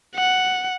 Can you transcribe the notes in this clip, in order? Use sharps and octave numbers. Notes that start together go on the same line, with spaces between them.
F#5